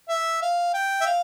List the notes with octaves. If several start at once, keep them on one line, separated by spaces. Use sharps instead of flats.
E5
F5
G5
E5
F5